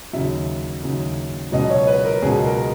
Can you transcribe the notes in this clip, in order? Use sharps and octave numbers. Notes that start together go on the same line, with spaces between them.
D#2 C#3 F#3 E5
D#2 C#3 F#3
C#2 B2 F#3 D#5
C#5
B4
A#4
C#2 B2 F#3 G#4
A#4